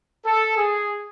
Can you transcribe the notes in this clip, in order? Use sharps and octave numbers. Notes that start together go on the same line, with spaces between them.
A4
G#4